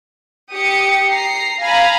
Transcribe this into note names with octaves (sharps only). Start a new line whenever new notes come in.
G4 D#6 C#7
A#5 C7
F5 G#5 A#5 B5